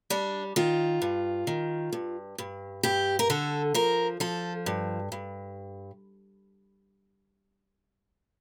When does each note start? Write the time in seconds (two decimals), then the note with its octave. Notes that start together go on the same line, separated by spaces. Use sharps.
0.10 G3 D4
0.56 D#3 F4
1.02 G2
1.47 D#3
1.93 G2
2.38 G2
2.83 G2 G4
3.19 A#4
3.30 D3 A4
3.74 F3 A#4
4.20 F3 A4
4.66 G2
5.12 G2